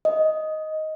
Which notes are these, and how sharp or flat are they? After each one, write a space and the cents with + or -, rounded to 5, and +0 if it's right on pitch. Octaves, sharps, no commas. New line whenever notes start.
D#5 +5